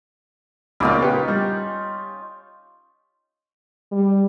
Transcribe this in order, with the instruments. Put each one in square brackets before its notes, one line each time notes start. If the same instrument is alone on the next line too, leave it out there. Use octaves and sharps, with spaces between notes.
[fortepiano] C#2 A#2 [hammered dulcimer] C#4 D#4 F4 [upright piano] B5 D6 F6
[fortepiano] B3 [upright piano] G4
[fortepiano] G3
[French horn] G3